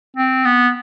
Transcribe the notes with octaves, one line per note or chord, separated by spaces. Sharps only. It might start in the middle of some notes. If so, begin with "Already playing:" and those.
C4
B3